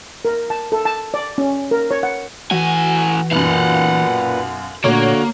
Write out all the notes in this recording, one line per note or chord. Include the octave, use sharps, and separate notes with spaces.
A#4
A5
A4
A5
D5
C#4
A#4
C#5
F#5
A2 E3 F#4 G#5
B1 F#2 A#2 B4 F5 F#5
A#2 D3 A3 A#3 F#4 C#5